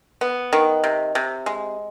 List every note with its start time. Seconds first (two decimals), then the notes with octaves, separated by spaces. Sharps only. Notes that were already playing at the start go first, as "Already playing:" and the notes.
0.21 B3
0.53 D#3
0.84 C3
1.15 C3
1.46 G#3